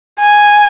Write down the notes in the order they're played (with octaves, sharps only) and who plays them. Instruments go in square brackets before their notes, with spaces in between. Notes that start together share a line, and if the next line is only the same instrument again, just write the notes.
[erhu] G#5